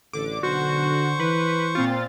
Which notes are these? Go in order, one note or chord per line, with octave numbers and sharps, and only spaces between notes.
A1 D3 D6
B1 F#4 C5 C#6
E3 B4
A#2 C4 F4 A6